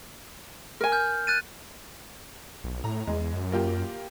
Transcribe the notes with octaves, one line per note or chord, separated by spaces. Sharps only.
A#4 G#5
F6 G6
F#6 A6 D#7
B1
A2 A#5
E2 G#3
F#2
A#3 F4 G4